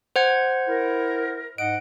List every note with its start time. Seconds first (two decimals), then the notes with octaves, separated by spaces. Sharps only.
0.16 C5 F#5 G#6
0.68 E4 A#4
1.58 G#2 D#5 F#5 D7